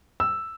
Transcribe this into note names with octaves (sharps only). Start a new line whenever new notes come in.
E6